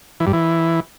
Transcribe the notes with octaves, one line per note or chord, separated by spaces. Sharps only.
E3
G2
E3